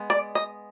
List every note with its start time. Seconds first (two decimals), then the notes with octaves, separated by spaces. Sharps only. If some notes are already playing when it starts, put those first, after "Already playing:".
Already playing: G#3 B3
0.10 D5
0.35 D#5